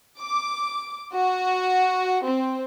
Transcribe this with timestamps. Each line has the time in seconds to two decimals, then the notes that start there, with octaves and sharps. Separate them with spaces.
0.20 D6
1.14 F#4
2.23 C4